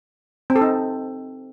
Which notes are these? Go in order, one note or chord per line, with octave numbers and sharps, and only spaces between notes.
C4
A4
D#4